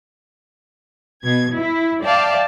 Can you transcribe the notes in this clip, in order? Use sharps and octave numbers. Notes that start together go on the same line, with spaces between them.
B2 G#6
E4
D5 E5 F5 G5 A5